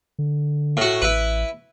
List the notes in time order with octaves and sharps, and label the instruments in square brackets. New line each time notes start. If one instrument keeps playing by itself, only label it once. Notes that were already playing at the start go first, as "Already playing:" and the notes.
[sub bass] D3
[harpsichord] A2 F#4
[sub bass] A1 [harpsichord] E4 B4